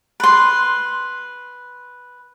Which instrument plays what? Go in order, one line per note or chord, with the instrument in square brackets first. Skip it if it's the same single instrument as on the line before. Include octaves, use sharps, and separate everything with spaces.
[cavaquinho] B4 C6